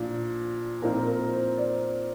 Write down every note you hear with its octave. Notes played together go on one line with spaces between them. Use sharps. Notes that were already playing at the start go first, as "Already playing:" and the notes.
Already playing: A#2 F3 D4
A#2 F3 C4 D#4 A#4
A#4
C5
D5